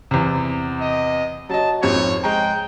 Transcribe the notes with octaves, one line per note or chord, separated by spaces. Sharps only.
E2 C3
D#5
F#3 D#5 A5
G#1 F2 C4 C#5
G#3 G5 A#5